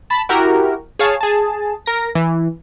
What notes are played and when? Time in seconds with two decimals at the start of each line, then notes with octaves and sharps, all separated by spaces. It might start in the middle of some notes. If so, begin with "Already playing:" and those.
0.10 A5 B5
0.29 E4 F#4 G4 A#4
0.99 G#4 C#5 F5 A5
1.21 G#4 A5
1.86 A#4 A#6
2.15 E3